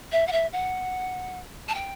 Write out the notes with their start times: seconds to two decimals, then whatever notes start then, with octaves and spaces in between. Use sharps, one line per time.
0.11 E5
0.27 F#5
0.32 E5
0.52 F#5
1.68 A5
1.74 G5